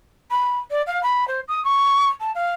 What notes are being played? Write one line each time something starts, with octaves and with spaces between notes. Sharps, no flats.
B5
D5
F5
B5
C5
D#6
C#6
A5
F5